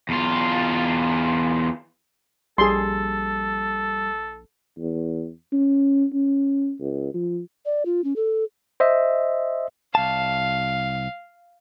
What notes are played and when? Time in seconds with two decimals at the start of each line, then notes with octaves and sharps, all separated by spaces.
0.09 E2 F4
2.58 A#1 G3 G#4 A4 C6
4.78 E2
5.52 C#4
6.13 C#4
6.80 C#2
7.14 F3
7.65 D5
7.86 F4
8.04 C#4
8.16 A4
8.80 C5 D#5 E5
9.95 C2 F5 A5